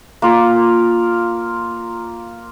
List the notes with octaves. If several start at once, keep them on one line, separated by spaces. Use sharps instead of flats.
A#3 F4 A#4